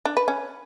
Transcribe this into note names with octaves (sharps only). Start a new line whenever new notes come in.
D4
B4
C#4